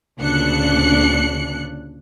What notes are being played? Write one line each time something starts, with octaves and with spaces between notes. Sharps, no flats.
D2 A#2 C#3 D4 F#6 C#7